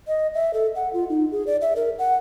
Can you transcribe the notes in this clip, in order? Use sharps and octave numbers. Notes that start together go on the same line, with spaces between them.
D#5
E5
A4
F#5
F4
D#4
G#4
D5
E5
A#4
F#5